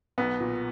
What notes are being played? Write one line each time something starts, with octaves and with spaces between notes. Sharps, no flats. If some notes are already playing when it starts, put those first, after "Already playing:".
B1 B3
A#2